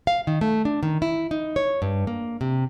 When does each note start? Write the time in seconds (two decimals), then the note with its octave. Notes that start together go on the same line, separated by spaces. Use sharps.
0.07 F5
0.27 D#3
0.41 A3
0.65 D4
0.83 D#3
1.02 E4
1.31 D#4
1.56 C#5
1.82 G2
2.07 A#3
2.41 C3